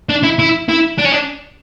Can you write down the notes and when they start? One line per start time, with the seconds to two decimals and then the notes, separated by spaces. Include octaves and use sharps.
0.09 D4
0.24 E4
0.39 E4
0.69 E4
0.98 D4
1.05 C#4
1.12 D4